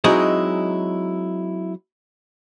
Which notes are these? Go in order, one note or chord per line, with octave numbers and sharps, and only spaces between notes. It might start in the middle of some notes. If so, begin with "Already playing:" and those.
F#3 G#3 C4 D#4 E4 G#4